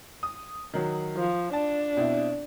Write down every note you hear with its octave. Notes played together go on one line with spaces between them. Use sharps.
D#6
D#3 F#3 F#4
F3
D4 A5
B2 C4 E4